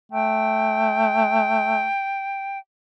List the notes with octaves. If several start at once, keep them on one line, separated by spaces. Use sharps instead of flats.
A3 G5